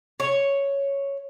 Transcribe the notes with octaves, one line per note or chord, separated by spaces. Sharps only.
C#5